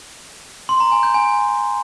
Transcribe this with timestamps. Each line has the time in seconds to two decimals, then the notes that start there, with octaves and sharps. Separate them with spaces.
0.69 C6
0.80 A#5
0.92 G#5
1.03 G6
1.14 G#5